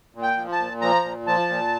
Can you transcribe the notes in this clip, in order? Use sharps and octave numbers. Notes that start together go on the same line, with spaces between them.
A#2
G5
F3
A5
A#2
F3 A#5
A#2
F3 A5
A#2